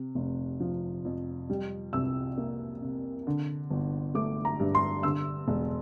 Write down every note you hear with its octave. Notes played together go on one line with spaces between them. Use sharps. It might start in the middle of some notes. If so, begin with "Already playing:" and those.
Already playing: C3
F1
F3
F2
G3
C2 E6
A#3
C3
D3
G1
A3 D6
A#5
G2
C6
D3 E6
E1